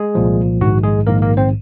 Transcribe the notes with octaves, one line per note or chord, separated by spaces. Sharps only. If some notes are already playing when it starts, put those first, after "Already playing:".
Already playing: G#3 G#4
C2 A#2 F3
A#1 G#2 D#3 F#4
G#3 G#4
A#1 G#2 D#3 A#3 A#4
A#3 A#4
C4 C5